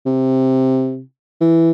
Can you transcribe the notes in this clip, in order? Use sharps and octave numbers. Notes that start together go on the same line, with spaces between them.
C3
E3